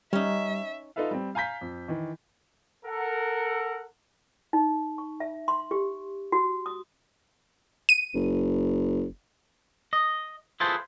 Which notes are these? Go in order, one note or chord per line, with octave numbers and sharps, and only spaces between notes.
G3 C#4 D#4 E5
D#4 F4 A4 B4 E5 F5
G3 C4
F5 G#5 A#5 G6 B6
F2
D#3 E3
A4 A#4 F#5
D#4
C#6
E5
C6
G4
F#4
D#6
D#7
F#1
D#5
E4 F4 G#4 A4 B4 C5